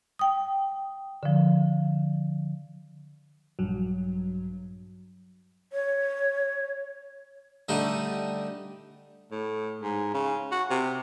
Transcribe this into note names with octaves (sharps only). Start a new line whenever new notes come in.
G5 D#6
D3 F3
A#1 G2 F#3
C#5
D3 G3 A3 D#4
A2
G#2
C#3
F#4
C3